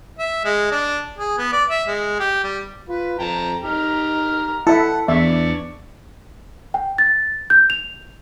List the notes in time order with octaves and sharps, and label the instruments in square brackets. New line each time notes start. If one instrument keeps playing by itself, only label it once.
[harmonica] E5
G#3
D4
G#4
B3
D5
E5
G#3
G4
G3
[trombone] F4 [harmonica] B4
[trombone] F2 [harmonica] G5 A5 A#5
[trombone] D#4 [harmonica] G4 A#5 F6
[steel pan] E4 E5 [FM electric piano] A4 [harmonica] F#5
[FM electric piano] E2 [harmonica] E3 D5 C#6 [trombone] D4 [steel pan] E5
[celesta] G5
A6
G6
F7